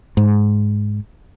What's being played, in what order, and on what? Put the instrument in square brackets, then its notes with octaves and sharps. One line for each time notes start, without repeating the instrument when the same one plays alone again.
[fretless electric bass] G#2